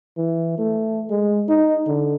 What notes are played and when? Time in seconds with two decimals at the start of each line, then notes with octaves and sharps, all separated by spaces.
0.17 E3
0.59 A3
1.10 G#3
1.49 D#4
1.87 D3